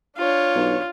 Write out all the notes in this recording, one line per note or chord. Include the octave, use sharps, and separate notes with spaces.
D4 F4 C#5
B1